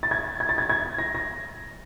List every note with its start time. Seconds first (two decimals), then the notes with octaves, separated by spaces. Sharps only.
0.03 A6
0.11 G#6
0.40 G#6
0.49 A6
0.58 G#6
0.69 G#6
0.98 A#6
1.15 A#6